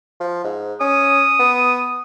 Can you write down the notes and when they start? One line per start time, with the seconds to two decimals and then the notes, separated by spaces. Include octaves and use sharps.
0.20 F3
0.45 G#2
0.80 C#4 D#6
1.39 B3